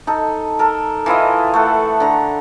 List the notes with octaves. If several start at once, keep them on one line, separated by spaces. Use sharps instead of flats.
D#4 A4
A4 A#4
E3 E4 F4 D#5
A3 A4 F#5
D3 A#5